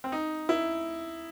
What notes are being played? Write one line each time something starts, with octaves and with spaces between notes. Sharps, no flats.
C4
D#4
E4